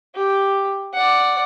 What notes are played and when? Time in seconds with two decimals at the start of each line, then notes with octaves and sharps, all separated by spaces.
0.15 G4
0.94 D5 F#5